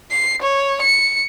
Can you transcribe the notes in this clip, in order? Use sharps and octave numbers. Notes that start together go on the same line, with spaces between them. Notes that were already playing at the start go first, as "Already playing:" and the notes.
C7
C#5
C#7